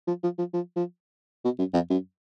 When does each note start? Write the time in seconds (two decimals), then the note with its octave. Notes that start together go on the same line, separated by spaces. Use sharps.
0.07 F3
0.23 F3
0.38 F3
0.53 F3
0.76 F3
1.45 B2
1.59 F#2
1.74 F2
1.90 F#2